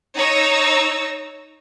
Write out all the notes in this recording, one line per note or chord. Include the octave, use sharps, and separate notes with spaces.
D#4 C#5 E6 A#6